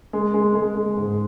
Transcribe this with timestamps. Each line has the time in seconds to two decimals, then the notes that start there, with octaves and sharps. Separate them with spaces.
0.13 G#3
0.34 G#3
0.55 G#3
0.75 G#3
0.97 G#2